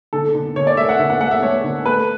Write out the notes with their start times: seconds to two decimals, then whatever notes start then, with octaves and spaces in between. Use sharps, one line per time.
0.13 D3 A4
0.35 D3
0.56 D3 C#5
0.67 D5
0.77 A3 E5
0.89 F#5
0.99 D3 E5
1.10 F#5
1.21 A3 F#5
1.31 E5
1.42 A3 C#5
1.64 D3
1.86 A3 B4